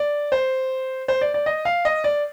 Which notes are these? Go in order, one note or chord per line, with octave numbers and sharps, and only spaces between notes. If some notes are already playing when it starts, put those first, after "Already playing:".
Already playing: D5
C5
C5
D5
D5
D#5
F5
D#5
D5